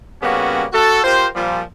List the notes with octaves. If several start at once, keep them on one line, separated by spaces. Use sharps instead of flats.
C#3 G3 A#3 B3 C#4 F#4
F#4 A4
F4 G4 A#4 C5
A#2 F3 G3